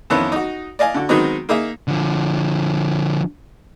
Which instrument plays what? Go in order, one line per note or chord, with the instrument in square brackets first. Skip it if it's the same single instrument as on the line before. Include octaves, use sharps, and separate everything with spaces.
[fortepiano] F2 D#3 E3 B3 C#4 E4
D#4 F#4
D5 D#5 F5 G#5
D3 F#4
D#3 F#3 G#3 B3 C4 D#4
A#3 D#4 G#4 E5
[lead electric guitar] D3 F3